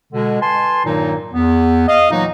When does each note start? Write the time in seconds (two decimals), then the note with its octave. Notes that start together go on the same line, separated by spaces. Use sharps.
0.13 B2 D3 G#3
0.41 B4 G#5 A5 C6
0.85 G2 A#2 D#3 F#3 A#3 D#4
1.33 E2 B3
1.88 D#5 F5
2.10 A#2 E3 F#3 A#3 D#4